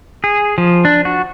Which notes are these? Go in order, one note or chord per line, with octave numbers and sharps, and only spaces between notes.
G#4
F3
D4
F#4